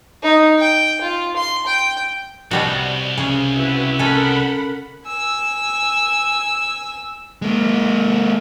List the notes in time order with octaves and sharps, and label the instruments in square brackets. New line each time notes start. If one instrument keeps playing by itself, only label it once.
[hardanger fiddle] D#4
G5
F4
C6
G5
[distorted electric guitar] C2 [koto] B2 G3 F#4
[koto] C#3 G#4
[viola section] E4 F#4 B4
[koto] C#4 A4 [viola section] A#4 F#5 B5
[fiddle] G#5 E6
[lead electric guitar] G#3 A#3